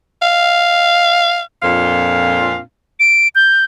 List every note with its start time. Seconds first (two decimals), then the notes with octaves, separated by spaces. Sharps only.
0.22 F5
1.63 F2 A#2 C4 D4 F4 F5
3.00 D7
3.35 G6